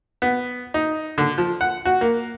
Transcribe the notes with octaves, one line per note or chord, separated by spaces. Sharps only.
B3
D#4
D3
F3
F#5
F#4
A#3